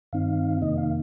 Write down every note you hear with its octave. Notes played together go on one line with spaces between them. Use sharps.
G2 D#3 C4 D#4 F5
F2 C3 D#3 A#3 D#4 D#5
F5